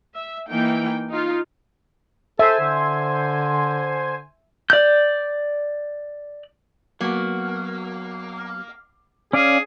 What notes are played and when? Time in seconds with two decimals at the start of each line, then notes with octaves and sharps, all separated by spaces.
0.14 E5
0.47 E3 A#3 D#4 G5
1.09 D#4 F4
2.39 A4 C5 E5 G#5
2.60 D3
4.70 D5 G6
7.01 F#3 A#3 B3 F#4
9.33 C#4 G#4 D5 F5